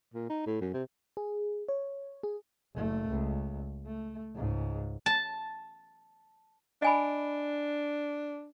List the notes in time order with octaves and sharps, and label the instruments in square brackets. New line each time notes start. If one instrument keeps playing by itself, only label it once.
[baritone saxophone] A#2
D#4
A2
F#2
C3
[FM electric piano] G#4
C#5
G#4
[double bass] F#1 A3
C#2
A3
C#2 G#2
[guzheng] A5
[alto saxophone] D4 [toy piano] D#5 G#5 B5